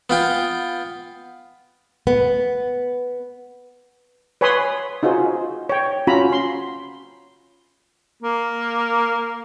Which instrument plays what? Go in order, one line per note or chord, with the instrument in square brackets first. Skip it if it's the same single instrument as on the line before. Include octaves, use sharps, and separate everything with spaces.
[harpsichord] B3 F4 G5
[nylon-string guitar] B3
[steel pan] B4 C#5 G#5 B5 C6 D#6
D#4 F4 F#4 G#4 C5
C#5 G5
C#4 F4 F#4 A#5 B5
C6
[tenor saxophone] A#3